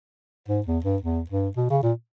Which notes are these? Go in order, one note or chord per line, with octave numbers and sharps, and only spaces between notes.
G#2
E2
G2
E2
G2
B2
C#3
A#2